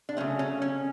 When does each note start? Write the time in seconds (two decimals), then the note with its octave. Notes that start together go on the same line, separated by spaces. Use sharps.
0.09 D4
0.17 C#3 F#3 A3 C#4
0.39 C#4
0.62 C#4